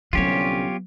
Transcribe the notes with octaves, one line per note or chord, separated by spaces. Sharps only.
C2 D3 F#3 B3 C#4 F4 G4 C#5